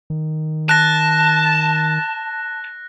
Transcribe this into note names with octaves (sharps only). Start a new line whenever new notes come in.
D#3
A5 F#6 A#6